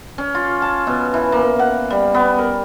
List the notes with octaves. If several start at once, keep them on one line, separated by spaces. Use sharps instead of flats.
C#4
F4
A5
B2
E3
A#3
F#5
G3
B3
A#4